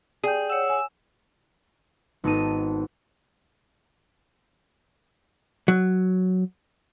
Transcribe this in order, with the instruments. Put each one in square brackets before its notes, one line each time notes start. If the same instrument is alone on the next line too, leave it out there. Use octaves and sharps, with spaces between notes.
[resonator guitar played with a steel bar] G#4 [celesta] D5 G5 G6
[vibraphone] C#5 F#5 [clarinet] E6
[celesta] G#5
[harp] G#1 B3 D#4 A4 D#7
[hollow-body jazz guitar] F#3